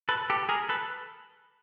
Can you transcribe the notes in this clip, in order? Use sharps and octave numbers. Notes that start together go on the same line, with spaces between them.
A4 B4
G4 A4
G#4 A#4
A4 B4